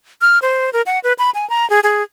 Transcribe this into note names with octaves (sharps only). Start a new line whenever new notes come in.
F6
C5
A#4
F#5
B4
B5
G#5
A#5
G#4
G#4